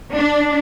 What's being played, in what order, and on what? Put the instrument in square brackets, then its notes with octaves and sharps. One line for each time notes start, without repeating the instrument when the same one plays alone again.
[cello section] D4